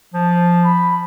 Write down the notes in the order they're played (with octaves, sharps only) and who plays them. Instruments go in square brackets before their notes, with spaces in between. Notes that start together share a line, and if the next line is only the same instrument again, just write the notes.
[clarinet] F3
[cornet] B5